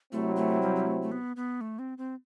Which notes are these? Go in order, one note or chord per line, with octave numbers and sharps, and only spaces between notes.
C3 F#3 A3 C4 E4
A3
G3
G3
A3
A3
B3
B3
A3
C4
C4